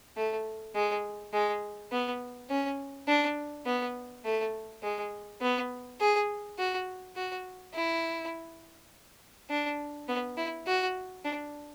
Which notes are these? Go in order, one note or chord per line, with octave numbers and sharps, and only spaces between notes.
A3
G#3
G#3
B3
C#4
D4
B3
A3
G#3
B3
G#4
F#4
F#4
E4
D4
B3
E4
F#4
D4